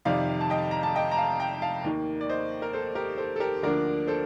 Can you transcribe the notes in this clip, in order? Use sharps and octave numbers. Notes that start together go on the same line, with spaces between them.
F2 C3 D#3 D5 F5
A5
D#5 G5
A#5
A5
D#5 G5
A#5
F5 A5
G5 A#5
F5 A5
D#2 D#3 A#3
D5
C5 D#5
A#4
A4 C5
G4 A#4
A4 C5
A4
G4 A#4
D2 D3 F3 A#3 D4 A#4 D5
A4 C5